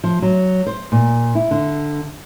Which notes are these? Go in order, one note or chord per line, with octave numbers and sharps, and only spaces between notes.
F3
F#3
C5
A#2
E4
D3